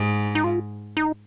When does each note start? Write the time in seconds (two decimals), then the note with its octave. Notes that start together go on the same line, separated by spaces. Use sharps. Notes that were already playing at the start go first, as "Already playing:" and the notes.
Already playing: G#2
0.35 D#4
0.44 F4
0.97 D#4